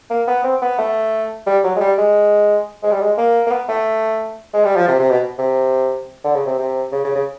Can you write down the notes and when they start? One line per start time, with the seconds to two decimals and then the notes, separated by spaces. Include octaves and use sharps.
0.10 A#3
0.27 B3
0.44 C4
0.62 B3
0.78 A3
1.46 G3
1.64 F#3
1.76 G#3
1.80 G3
1.98 G#3
2.83 G#3
2.92 G3
3.01 G#3
3.18 A#3
3.47 A#3
3.51 B3
3.69 A3
4.53 G#3
4.65 G3
4.76 F3
4.88 C3
4.99 C3
5.10 B2
5.39 C3
6.24 D3
6.35 C#3
6.46 C3
6.59 C3
6.92 C#3
7.04 C#3
7.15 C#3